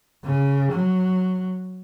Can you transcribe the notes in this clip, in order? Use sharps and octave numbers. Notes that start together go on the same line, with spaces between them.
C#3
F#3